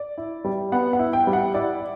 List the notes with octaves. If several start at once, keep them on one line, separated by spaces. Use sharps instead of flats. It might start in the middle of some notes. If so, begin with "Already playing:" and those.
Already playing: D5
E4
G3
B3 F#5
F#5
E4
G5
G3
F#5
E4 D5